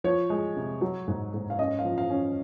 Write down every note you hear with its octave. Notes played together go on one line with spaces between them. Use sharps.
F3 C#5
G#3
C3
F#3
G#2
G#2
F5
C#4 D#5
F5
F3
F5
C#4